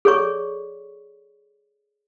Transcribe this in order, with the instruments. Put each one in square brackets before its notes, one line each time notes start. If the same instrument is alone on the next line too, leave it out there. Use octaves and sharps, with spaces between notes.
[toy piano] G#4 A4 C#5 D5 C#6